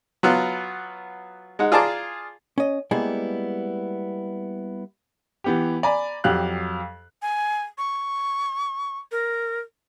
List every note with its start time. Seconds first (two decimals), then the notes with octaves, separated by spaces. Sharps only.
0.23 F#3 B3 F4
1.59 G#3 D#4 F#5
1.72 F4 G#4 D5 A5 A#5 D6
2.58 C#4 D#5
2.91 G3 G#3 A#3 B3 E4 G#4
5.44 E3 B3 G4
5.83 D5 G#5 A#5 B5
6.24 F2 F#3 G4 F5 F#6
7.22 G#5
7.78 C#6
9.12 A#4